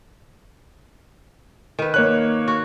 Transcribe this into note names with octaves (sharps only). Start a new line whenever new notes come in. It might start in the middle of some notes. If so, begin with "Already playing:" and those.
D#3 B4
A#3 C#5 F#6
F#4